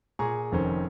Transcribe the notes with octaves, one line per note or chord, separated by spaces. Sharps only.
A#2 G#4 A#5 C#6
F1 F2 D#3 C#4 A#4 C5